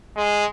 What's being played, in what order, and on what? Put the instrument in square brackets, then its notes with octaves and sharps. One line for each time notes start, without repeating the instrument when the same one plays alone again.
[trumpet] G#3